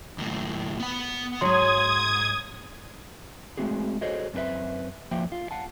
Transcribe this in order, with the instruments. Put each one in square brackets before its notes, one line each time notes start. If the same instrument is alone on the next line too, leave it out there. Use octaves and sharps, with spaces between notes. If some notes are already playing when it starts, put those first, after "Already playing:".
[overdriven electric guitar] D#2 A2
B3 F#5
[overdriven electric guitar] C#2 G#2 [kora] F#3 F#4 [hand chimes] C6 [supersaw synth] D#6 G#6
[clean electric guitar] G#3 A3 C4 F#4 G#4
F#4 G#4 A4 C5 C#5 D#5
F#2 C4 D4 B4 E5
F2 F3 A#3 E5 G5
F4
F5 F#5 A5